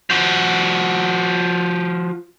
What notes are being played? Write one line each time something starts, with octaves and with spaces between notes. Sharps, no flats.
F3 F#4